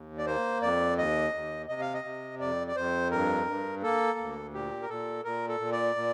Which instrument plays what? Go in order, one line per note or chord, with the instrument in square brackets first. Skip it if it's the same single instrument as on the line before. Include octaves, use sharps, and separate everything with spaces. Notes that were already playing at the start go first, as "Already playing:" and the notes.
Already playing: [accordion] D#2
D5
A#3 C5
F2 D5
D#2 D#5
D#2
C3 D#5
F5
D#5
C3
F2 D5
D5
F2 C5
G2 A#4
G2
A#3 A4
D2
A#2 G4
A#4
A#2 A4
A#2 A#4
A4
A#2
D5
A#2